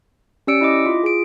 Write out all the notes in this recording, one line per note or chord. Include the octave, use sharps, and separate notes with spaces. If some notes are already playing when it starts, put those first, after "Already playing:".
C#4 G4 D5 E6 C#7 D7
E4 D#5 D6
F4
G#4 D7